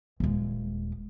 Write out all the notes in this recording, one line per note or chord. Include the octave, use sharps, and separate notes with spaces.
D#1 G#3